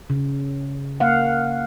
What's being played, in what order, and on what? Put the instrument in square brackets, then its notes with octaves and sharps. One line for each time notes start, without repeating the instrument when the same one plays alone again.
[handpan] C#3
A#3 F5 F#5